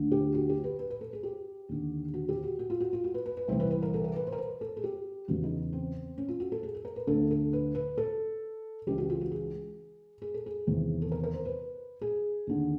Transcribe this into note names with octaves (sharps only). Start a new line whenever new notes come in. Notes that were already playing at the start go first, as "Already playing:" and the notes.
Already playing: D2 D3
G4
F#4
G4
B4
B4
B4
A4
G#4
G4
D#2 D3
F#4
G4
F#4
F#4
F4
F#4
F4
F#4
B4
B4
B4
C2 C3 E3 C5
B4
B4
A#4
A4
A#4
B4
C5
A#4
B4
A4
G#4
G4
E2 C#3 E3 F#4
D#4
C4
C#4
F4
F#4
A4
G#4
A4
A#4
B4
D2 D3 A4
A4
B4
B4
A4
C#2 C#3 E3 G4
F#4
F4
F#4
G#4
G#4
A4
G#4
E2 C3 D#3
A4
A#4
A#4
C5
B4
G#4
D#2 D3